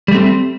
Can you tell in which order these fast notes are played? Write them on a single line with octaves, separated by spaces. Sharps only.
G3 A3 C4